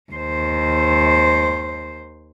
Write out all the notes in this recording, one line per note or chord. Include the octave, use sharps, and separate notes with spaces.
D#2 C5